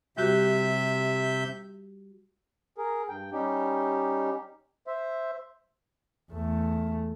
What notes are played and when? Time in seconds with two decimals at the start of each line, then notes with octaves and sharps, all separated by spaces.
0.17 C3 G3 F#4 G4 E5 G6
2.78 G#4 A#4
3.08 G2 G5
3.32 G3 C#4 D#4 G4
4.87 C5 E5
6.32 E2 A3